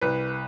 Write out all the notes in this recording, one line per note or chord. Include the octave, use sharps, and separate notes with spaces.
C2 B4